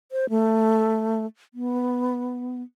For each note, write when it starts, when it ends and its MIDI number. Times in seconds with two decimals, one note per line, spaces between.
0.12 0.29 72
0.30 1.26 57
1.54 2.62 59